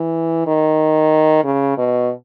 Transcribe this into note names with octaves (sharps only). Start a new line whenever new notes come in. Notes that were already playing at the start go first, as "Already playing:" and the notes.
Already playing: E3
D#3
C#3
B2